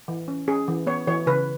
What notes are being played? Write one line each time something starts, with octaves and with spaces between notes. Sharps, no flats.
E3
C#4
C#4 G#4
E3
B3 C#5
E3 C#5
C#3 B4